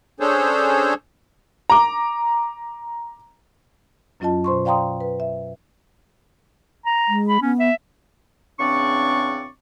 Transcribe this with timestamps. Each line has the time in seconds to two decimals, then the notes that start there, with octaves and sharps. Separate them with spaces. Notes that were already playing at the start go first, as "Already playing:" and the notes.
0.20 C#4 D4 G#4 A4 C5 C#5
1.70 A#5 D6
4.20 F#2 F#3 C#4 F4 D#5 A5
4.44 B2 C5 C6 C#6
4.65 D5 F5 G5 A#5 C6 D#6
5.00 B4
5.20 E5
6.86 A#5
7.08 G#3
7.29 B5
7.42 B3 C#4
7.60 E5
8.60 E2 C#3 C4 D4 D5 C#6